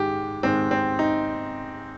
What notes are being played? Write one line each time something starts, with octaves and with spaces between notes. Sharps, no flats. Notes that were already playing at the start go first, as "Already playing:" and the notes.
Already playing: G#2 D#3 G#3 G4
G#2 D#3 G#3 C4
C4
D#4